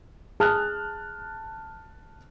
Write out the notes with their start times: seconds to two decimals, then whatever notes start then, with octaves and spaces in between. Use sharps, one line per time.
0.40 G#4 A5 F6 F#6